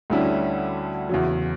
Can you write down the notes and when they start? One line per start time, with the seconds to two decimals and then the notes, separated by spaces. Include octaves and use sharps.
0.10 D2 D3 G3 C#4 E4
1.09 E2 C#3 F#3